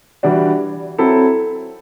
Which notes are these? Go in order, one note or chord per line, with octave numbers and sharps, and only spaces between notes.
E3 G3 D4 F#4
F#3 C4 E4 A4